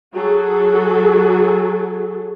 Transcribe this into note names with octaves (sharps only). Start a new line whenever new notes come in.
F#3 F#4 G#4 A4